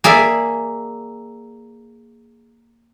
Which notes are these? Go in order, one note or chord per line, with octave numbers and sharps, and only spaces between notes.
A#3 G#4 D5 E5